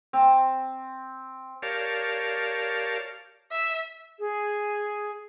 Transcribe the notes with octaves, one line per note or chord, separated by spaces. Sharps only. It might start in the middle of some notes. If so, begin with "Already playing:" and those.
C4
G4 A#4 C#5 D5 F5 A5
E5
G#4